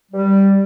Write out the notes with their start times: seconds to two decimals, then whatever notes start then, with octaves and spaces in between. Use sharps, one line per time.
0.12 G3